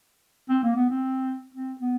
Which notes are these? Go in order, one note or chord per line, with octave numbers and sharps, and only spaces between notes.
C4
A#3
B3
C4
C4
B3